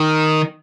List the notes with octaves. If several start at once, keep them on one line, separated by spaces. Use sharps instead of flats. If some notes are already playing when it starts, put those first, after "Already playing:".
Already playing: D#3